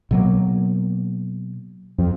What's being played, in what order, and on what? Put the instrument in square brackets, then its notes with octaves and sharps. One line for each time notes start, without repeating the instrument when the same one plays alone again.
[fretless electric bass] B2 F#3 A#3
[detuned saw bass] F2